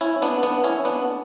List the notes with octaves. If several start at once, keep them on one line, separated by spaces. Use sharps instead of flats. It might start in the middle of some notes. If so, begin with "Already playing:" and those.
C#4 E4
B3 D4
B3 D4
C#4 E4
B3 D4